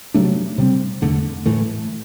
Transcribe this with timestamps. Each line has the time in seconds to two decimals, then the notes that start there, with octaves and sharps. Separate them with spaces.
0.14 C3 F#3 A3 D4
0.58 C3 G3 C4
1.02 E2 D3 A3
1.46 A2 E3 A3